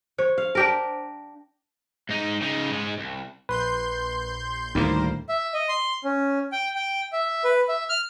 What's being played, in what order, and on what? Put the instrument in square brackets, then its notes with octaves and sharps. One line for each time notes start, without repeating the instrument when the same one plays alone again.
[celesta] C5 [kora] C#5
[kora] F5
D4 G4 A#4
[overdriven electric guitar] G#2 D#4
C#3 D#4
G#2 G#3
C2
[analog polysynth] A#1 C6 G6 [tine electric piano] B4
[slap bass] D2 A2 [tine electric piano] D#3 [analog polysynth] G3 A#3 C5
[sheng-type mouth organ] E5
D#5
C6
C#4
G5
G5
E5
B4
E5
F6